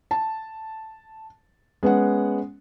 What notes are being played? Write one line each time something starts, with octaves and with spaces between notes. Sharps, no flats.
A5
G#3 B3 C#4 F#5